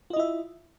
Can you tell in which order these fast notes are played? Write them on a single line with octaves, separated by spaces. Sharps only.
F4 D#5 E4 E5